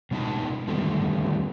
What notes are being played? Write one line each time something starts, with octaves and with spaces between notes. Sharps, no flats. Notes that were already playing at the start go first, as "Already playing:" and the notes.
B2 G#3 B3 D#4 A5
D3 D#3 G3 A3 B3 C4